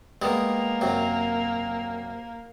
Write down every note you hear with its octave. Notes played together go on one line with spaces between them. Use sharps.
G3 G#3 A#3 B3
F#2 C3 F#3